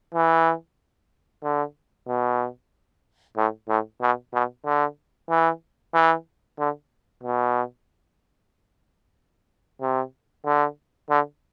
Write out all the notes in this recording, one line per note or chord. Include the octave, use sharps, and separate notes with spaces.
E3
D3
B2
A2
A2
B2
B2
D3
E3
E3
D3
B2
C3
D3
D3